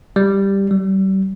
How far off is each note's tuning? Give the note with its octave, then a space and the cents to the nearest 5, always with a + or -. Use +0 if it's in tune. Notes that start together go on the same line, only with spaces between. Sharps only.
G3 +5
G3 -35